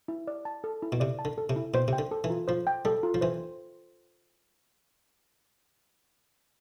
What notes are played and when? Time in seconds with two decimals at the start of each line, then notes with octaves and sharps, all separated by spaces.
0.08 E4
0.28 D5
0.45 A5
0.64 A4
0.82 E4
0.92 B2
1.00 C3 D5
1.19 A5
1.25 D3
1.38 A4
1.50 C3
1.56 E4
1.74 B2 C5
1.88 C3 G5
1.99 D3
2.11 A4
2.24 E3
2.30 F4
2.48 F3 C5
2.67 G5
2.85 G3 A4
3.03 F4
3.14 F3
3.21 E3 C5